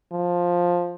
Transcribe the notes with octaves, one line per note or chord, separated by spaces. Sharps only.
F3